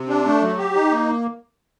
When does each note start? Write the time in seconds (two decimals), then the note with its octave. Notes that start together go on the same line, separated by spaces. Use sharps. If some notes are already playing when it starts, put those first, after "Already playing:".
Already playing: C3
0.09 D4
0.25 A3
0.42 F#3
0.58 G4
0.75 D#4
0.91 A#3